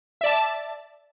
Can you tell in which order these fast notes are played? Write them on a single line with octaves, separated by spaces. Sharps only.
E5 D5 A5